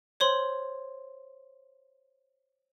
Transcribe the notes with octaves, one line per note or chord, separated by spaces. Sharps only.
C5 C#5 C6 F#7